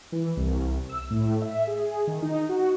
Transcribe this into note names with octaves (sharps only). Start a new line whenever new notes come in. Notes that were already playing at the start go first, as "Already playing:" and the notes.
E3
C2
E6
A2
E5
G#4
D#3
D#4
F#4